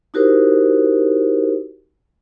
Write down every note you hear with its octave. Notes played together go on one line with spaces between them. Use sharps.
D#4 E4 F#4 G4 A#4 C5